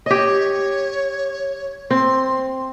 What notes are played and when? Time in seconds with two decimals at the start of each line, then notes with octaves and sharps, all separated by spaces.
0.06 G4 C#5 D#5
1.91 C4 C6